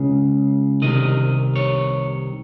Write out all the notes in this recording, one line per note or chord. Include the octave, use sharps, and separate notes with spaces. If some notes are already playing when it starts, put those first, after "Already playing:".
Already playing: C#2 C#3
C2 C3 D#3 D#5
C#5